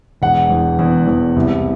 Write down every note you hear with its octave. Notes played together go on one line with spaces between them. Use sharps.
E1 F#5
E2
E2
E2
C2